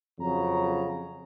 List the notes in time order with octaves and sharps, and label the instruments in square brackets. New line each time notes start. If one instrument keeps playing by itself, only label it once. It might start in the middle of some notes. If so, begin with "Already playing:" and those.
[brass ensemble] F2 C#3 F#3 A#5